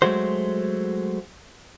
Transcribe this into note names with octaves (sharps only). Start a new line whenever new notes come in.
F#3 G#3 A3 F#4 C5